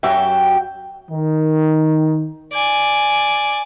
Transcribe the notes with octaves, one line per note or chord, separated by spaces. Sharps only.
F#2 F#3 F#4 G4 E5 G5
D#3
D5 G#5